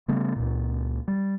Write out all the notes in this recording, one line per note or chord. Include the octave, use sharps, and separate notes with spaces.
C#3 G3 A3 B3
C#2 A#2
G3